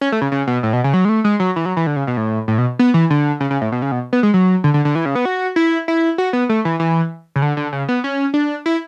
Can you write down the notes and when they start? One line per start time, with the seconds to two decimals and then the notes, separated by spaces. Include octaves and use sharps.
0.01 C#4
0.12 A3
0.21 C#3
0.32 C#3
0.47 B2
0.63 A2
0.73 B2
0.84 C#3
0.94 F#3
1.05 G#3
1.09 A3
1.24 G#3
1.40 F#3
1.56 E3
1.66 F#3
1.77 E3
1.87 D3
1.96 C#3
2.07 B2
2.17 A2
2.48 A2
2.58 B2
2.79 B3
2.94 E3
3.10 D3
3.40 C#3
3.50 C#3
3.62 A2
3.72 B2
3.82 C#3
3.92 B2
4.13 B3
4.23 G#3
4.34 F#3
4.64 D3
4.74 D3
4.85 D3
4.95 E3
5.06 C#3
5.15 B3
5.25 F#4
5.56 E4
5.88 E4
6.18 F#4
6.33 B3
6.49 A3
6.65 E3
6.80 E3
7.36 C#3
7.42 D3
7.57 D3
7.73 C#3
7.89 B3
8.04 C#4
8.34 D4
8.66 E4